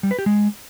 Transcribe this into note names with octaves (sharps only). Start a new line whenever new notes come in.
G3
B4
G4
G#3